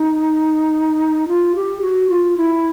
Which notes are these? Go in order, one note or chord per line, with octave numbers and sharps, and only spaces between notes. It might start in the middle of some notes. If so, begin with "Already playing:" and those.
Already playing: D#4
F4
G4
F#4
F4
E4